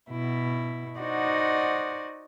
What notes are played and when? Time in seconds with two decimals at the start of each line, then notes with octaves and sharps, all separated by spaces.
0.11 B2 E4
0.99 D#4 F#4 C5 D5 D#5 F#5